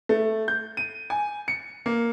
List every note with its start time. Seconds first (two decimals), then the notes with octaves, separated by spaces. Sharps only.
0.09 A3
0.48 G6
0.77 D#7
1.10 G#5
1.48 C#7
1.86 A#3